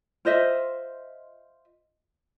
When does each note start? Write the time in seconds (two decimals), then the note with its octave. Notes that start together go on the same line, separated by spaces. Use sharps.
0.25 F4 C5 D#5 E5